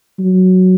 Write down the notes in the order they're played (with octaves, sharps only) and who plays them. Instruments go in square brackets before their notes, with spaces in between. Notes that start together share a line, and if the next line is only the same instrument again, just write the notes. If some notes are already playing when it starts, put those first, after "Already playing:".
[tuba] F#3